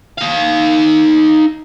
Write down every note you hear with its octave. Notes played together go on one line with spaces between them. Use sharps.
D#4 F5